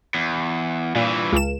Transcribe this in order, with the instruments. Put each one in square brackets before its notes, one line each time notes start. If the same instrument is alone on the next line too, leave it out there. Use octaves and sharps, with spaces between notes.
[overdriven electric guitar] E2
[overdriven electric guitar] G2 E3 [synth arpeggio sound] A#2
[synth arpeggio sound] C#2 E7